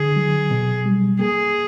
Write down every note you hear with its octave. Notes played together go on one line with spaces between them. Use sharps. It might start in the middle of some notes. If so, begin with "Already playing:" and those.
Already playing: D3 G#4
F#3
B2
G3
A#3 G#4